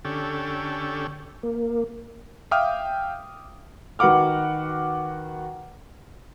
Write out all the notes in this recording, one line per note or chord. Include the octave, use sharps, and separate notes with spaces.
D3 C#4 G4 A4
A#3
E5 F5 G5 D6 D#6 F6
D#3 F#4 B4 F#5 D6 F6